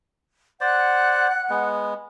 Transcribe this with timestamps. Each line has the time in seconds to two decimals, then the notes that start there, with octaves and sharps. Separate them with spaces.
0.61 C5 D5 F#5 F#6
1.50 G#3 B3